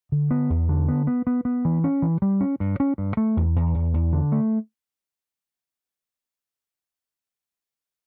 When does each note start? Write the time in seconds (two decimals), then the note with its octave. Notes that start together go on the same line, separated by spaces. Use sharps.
0.12 D3
0.31 B3
0.50 E2
0.69 D3
0.88 B3
1.07 B3
1.27 B3
1.45 B3
1.65 E3
1.84 C#4
2.02 E3
2.22 G3
2.41 C#4
2.60 G2
2.80 C#4
2.98 G2
3.17 A3
3.37 E2
3.56 E2
3.74 E2
3.94 E2
4.13 D3
4.32 A3